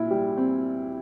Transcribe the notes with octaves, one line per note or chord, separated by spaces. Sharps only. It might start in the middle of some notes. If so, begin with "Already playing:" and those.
Already playing: A#2 E4
G3
C4